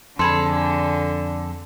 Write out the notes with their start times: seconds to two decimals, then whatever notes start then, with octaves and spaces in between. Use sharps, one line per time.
0.19 F2 D3 G#4 A4 B5 C6